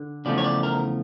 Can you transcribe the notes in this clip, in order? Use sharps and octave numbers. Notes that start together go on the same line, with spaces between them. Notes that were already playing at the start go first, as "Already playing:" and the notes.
Already playing: D3
E2 C#3 F3 A3 D5
C#5
D5
A#4